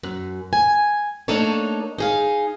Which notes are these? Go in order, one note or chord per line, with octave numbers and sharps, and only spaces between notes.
F#2
G#5
A3 A#3 D4 D#4 A4 C#5
D#4 G#4 F5